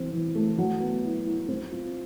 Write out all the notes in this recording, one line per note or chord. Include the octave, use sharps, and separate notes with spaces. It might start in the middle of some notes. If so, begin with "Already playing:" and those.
Already playing: E3 C4
E3
A3
F#3
B3
E4
E4
C4
F4